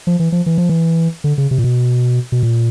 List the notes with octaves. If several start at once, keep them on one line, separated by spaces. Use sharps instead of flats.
F3
E3
F3
E3
F3
E3
D3
C#3
C3
A#2
B2
B2
A#2